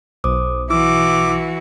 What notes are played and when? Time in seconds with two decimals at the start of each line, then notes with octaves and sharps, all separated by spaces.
0.24 B1 C5 D6 D#6
0.70 E3 E4 F#4 D6 E6